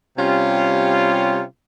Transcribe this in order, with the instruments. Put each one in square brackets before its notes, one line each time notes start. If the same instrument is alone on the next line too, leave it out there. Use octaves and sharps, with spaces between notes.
[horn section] C3 G3 C#4 F4